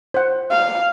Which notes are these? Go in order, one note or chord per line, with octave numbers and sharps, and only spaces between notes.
C5 F#5
F5